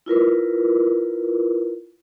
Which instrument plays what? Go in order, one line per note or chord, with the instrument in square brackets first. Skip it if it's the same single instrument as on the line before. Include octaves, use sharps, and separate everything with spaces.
[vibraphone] E4 F4 A#4 B4